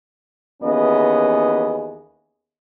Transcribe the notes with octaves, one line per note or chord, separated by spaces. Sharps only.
D#2 E3 B3 C#4 G#4 D#5